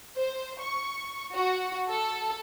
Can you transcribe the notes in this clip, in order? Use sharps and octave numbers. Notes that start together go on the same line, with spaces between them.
C5
C#6
F#4
A4